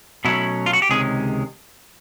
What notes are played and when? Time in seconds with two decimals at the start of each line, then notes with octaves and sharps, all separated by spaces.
0.25 B2 F#3 A3 C#4 E4
0.66 F4
0.73 F#4
0.82 G4
0.89 C#2 C3 D#3 G#3 C#4 G#4